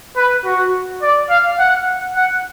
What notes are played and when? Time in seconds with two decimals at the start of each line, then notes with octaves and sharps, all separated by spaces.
0.17 B4
0.45 F#4
1.02 D5
1.30 F5
1.59 F#5
2.16 F#5